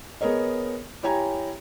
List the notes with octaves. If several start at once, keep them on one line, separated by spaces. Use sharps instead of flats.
B3 G#4 A#4 C#5 D#5
E4 G4 C#5 G5 G#5 A#5